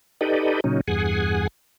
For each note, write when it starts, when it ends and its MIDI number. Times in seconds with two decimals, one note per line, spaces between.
0.21 0.60 63
0.21 0.60 67
0.21 0.60 69
0.21 0.60 71
0.21 0.60 74
0.21 0.60 75
0.64 0.81 46
0.64 0.81 49
0.64 0.81 54
0.64 0.81 61
0.64 0.81 63
0.88 1.47 40
0.88 1.47 43
0.88 1.47 68
0.88 1.47 78
0.88 1.47 80